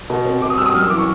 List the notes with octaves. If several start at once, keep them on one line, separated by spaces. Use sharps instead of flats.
B2
C4
B2 D6
D#6
G3 E6
D#6
F#2 F6
E6
E3 D6
C#6